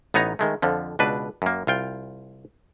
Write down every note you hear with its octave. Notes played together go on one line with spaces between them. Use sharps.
A1 B3 D#4 C#5 A#5
D#3 G#3 A3
F2 D3 F3
C#2 B2 D4 B4
F#2 A#3
C2 F4 G5